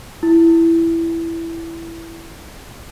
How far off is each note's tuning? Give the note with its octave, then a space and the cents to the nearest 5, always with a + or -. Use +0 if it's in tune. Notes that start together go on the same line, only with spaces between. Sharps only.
E4 +10